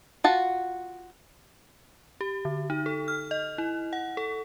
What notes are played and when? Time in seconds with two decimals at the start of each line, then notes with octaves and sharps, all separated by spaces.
0.24 F4 F#4 A5
2.21 G4
2.45 D3
2.70 D#4
2.86 A4
3.08 F6
3.31 D#5
3.58 E4
3.93 F#5
4.17 A4